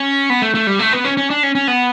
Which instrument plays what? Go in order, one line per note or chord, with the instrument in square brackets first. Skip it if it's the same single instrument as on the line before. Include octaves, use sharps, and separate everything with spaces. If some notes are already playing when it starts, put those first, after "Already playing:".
Already playing: [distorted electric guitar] C#4
B3
A3
A3
G3
A3
B3
C#4
C#4
D4
C#4
C#4
B3